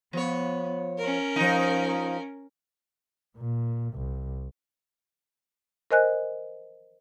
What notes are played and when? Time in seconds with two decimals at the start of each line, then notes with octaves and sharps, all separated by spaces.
0.13 F3 B3 C#5
0.99 C#4 A#4
1.36 F3 D#4
3.38 A#2
3.94 C2
5.91 A#4 C5 D#5 G#5 F#6